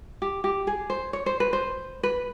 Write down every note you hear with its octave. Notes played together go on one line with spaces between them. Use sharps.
G4
G4
G#4
C5
C#5
C5
B4
C5
B4